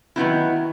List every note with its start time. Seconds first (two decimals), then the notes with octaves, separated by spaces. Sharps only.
0.16 D#3 F#3 B3 D#4 E4